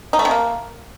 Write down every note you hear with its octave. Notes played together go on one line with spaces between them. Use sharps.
D#4
A3
C3
A#3